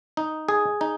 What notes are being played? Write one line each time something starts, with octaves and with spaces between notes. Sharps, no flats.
D#4
G#4
D#4